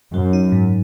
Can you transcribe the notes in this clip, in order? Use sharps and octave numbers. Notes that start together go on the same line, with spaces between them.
F#2 F#3
D#4
G#2